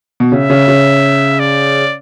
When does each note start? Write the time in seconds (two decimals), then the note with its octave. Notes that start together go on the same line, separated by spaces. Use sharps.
0.20 B2
0.32 C#3 E5
0.50 C#3
0.68 C#3
1.40 D5